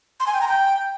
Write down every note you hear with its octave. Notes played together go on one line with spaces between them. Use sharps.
C6
G#5
G5
A#5
G5